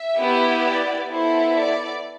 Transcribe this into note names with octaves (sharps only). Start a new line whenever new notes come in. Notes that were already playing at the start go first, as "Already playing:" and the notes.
Already playing: E5
B3 E4 G4
D5
B3 E4 A4 C5
D5